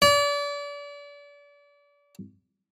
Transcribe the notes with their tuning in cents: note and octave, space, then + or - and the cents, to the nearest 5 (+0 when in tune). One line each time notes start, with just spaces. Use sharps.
D5 -35